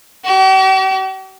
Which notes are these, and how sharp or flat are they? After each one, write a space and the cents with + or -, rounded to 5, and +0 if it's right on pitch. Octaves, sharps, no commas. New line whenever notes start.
G4 -45